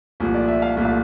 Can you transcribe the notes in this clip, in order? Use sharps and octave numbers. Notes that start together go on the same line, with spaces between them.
C2 A#2 F3 A3
D5
E5
F5
C2 A#2 F3 A3
F5